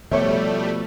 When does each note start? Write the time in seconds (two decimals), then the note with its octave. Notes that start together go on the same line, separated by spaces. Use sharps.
0.11 B2 F3 G3 A3 A4 C#5 E5